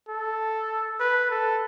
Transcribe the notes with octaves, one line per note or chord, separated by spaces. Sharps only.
A4
B4
A4